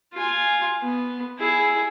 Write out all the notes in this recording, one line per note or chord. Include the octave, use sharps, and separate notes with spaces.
F4 G#5
B3
E4 G#4